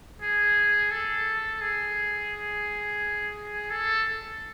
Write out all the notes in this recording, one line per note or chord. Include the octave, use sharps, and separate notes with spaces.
G#4
A4
G#4
A4